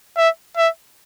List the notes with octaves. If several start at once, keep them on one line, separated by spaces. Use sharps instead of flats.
E5
E5